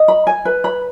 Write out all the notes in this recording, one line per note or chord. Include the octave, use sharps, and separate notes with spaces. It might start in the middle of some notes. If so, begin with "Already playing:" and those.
Already playing: D#5
B5
G#5
B4
B5